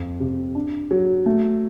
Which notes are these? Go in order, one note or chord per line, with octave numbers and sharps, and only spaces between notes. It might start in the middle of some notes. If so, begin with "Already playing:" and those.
Already playing: F2
C3
D4
F#3
A3